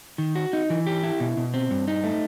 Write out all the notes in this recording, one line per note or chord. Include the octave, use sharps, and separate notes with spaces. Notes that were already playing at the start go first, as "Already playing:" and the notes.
D#3
F#4
D#4
E3
G4
E4
B2
B2
C4
G2
D#4
A3